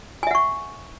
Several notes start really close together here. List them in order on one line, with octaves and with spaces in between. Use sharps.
G#5 E5 F#5 C#6